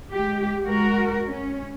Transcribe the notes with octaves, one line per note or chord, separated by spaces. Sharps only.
G#3 G4
G#3 F#4 A#4
C#4